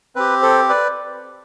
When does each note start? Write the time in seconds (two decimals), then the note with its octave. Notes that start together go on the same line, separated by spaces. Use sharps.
0.16 C4 G4 B4
0.42 A4 C5
0.69 B4 D5